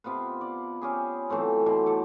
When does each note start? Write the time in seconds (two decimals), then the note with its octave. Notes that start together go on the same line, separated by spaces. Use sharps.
0.04 C3 B3 F4 B4
0.41 D5
0.81 C#4 G4 G#4
1.30 E3 F#3 A3 C4
1.66 B2 C5 D5
1.86 A4 D5